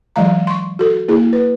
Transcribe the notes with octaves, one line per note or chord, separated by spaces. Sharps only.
E3 F#3 G#3 F5 A#5
C6 C#6
F#4 A4
A#3 E4 G#4
B4